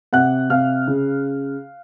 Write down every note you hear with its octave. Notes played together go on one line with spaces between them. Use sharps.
C3 F#5 F#6
C3 F5 F6
C#3